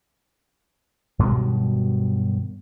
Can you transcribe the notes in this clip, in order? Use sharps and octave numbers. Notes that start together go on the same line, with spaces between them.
G2 B2 D#3 F#3